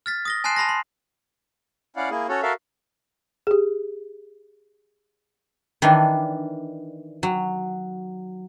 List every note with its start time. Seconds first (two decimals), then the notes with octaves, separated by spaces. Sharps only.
0.06 F6 A6 B6
0.25 D#6 A#6 G7
0.44 G#5 A5 C6 F#6 C7 E7
0.56 A5 B5 C6 A#6
0.69 C6
1.96 C#4 E4 D5 F5 F#5
2.10 A#3 E4 G#4
2.29 C#4 F#4 A4 C#5
2.42 F#4 A4 A#4 E5 F5
3.47 G4 G#4
5.82 D#3 E3 D4
7.23 F#3